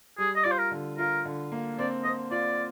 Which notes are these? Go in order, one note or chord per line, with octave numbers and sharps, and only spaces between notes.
G3 G#4
D#5
F4 D5
C5
A#4
D3
F4 A#4
D3
A#3
C4 D5
C4 D#5
F4 D5